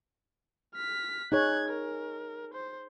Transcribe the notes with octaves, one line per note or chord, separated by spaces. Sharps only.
F6 B6
D#4 G#4 C#5 F#6 G#6
A#4
C5